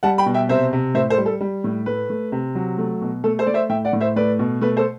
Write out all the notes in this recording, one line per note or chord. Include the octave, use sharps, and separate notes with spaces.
G3 F#5 A5
G5 B5
B2
E5 G5
C3 C5 E5
C3
A2 C5 E5
A4 C5
G3
A4
G3
A2
A3 B4
A3
C3
F#3
A3
B2
A3 A4
A4 C5
A3 D5
C5 E5
A2 E5 G5
D5 F#5
A2
C5 E5
A3 B4 D5
B2
A3 B4
A4 C5